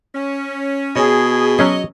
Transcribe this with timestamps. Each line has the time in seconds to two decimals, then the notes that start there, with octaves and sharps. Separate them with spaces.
0.15 C#4
0.96 B2 G#4 C#5 D#5
1.59 F#3 C#4 G#4 C#5 D#5